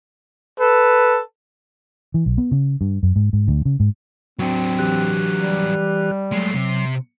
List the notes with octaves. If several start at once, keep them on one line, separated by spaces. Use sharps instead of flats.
A4 B4
E3
B1
B3
C#3
G2
F#2
G#2
G#2
D2
C#3
G#2
F#3 C4 D4
E3 G4 F#6
G3
F#3 G#3 A3 C7
C3